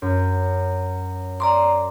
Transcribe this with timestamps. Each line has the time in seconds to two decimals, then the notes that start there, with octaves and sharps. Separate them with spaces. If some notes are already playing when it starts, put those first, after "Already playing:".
0.02 F#2
1.40 D5 A#5 C6 D6